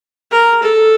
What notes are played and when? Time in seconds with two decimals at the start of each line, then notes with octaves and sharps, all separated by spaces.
0.32 A#4
0.63 A4